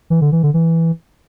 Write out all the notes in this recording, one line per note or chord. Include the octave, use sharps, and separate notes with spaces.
E3
D3
E3
D3
E3